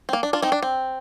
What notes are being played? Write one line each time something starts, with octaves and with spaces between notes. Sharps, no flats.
C4
A#3
D4
D4 F4
C4 D#4
D4
C4